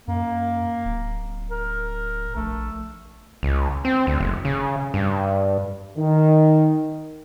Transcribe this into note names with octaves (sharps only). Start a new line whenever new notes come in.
F#2 A#3
D1
A#4
A#1 A3
C#2
C4
D2
F#1
C#3
G2
D#3